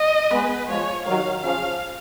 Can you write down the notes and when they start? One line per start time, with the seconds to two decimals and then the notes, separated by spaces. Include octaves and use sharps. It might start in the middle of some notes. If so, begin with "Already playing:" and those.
Already playing: D#5
0.31 G#3 B3 B4
0.68 F3 G#3 C#5
1.06 D#3 F#3 F5
1.42 C#3 F3 F5